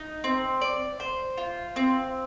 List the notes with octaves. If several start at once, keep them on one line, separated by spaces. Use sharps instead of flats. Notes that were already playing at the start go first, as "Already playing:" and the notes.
Already playing: D#4
C4
D5
C5
F4
C4